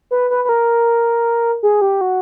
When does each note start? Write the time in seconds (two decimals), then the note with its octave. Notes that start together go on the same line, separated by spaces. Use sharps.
0.11 B4
0.30 B4
0.45 B4
0.49 A#4
1.63 G#4
1.81 G4
2.01 F#4